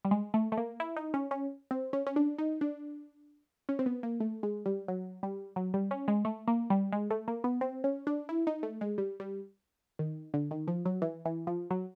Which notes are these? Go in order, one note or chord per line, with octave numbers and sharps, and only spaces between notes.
G3
G#3
A3
A3
A#3
E4
D#4
C#4
C#4
C4
C#4
C#4
D4
D#4
D4
C#4
C4
B3
A#3
A3
G#3
G3
F#3
G3
F#3
G3
C#4
G#3
A3
A#3
G3
G#3
A3
A#3
B3
C4
C#4
D4
E4
D#4
A3
G#3
G3
G3
D#3
D3
D#3
F3
F#3
E3
E3
F3
F#3